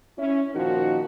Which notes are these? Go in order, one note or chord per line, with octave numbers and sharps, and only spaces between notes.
C#4 E4
A#2 D#3 F3 D#4 F#4 A#4